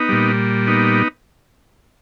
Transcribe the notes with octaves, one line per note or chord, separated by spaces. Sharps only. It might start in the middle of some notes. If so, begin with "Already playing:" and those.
Already playing: B3 D#4
A#2 G3
B3 D#4